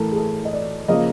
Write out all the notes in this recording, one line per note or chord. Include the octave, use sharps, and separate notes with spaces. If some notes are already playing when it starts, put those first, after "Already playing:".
Already playing: A2 E3 A3 A4 A#4
G#4
A4
D#5
D5
C#3 F3 A#3 D#5